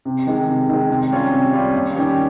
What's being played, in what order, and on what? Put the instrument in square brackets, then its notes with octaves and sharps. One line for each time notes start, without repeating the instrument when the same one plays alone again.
[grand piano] C3
D#3 G#3
C3
D#3 G#3
C3
G3 C#4 F4
C3
G3 C#4 F4
D#2
D#3 G3 C#4 G4